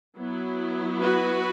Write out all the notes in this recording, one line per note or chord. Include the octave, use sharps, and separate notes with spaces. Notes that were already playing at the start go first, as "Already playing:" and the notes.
F#3 B3 E4
F#4 B4